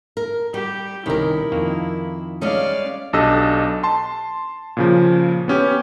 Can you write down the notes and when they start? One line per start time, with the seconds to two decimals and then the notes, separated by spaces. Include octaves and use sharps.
0.17 A#4
0.54 G3 G4
1.06 C2 D#3 C#4 E4 G4 A#4
1.52 F2 D#3 A#3
2.41 G3 G#3 C#4 D5 F5
3.13 B1 D4 G4 A4 D#5 E6
3.83 A5 C6
4.77 A#2 C#3 F3
5.48 B3 C#4 G4